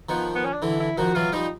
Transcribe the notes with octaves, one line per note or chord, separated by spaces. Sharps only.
D#3 F3 B3
B3
C#4
D4
D3 E3 E4
E4
D#3 F3 F#4
E3 F#3 F4
F3 G3 D#4